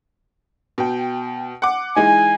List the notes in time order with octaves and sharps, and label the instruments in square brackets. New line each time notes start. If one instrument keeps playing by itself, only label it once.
[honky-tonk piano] B2 G5
F#5 D6
[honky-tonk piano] E3 G#3 D#4 [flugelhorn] G#5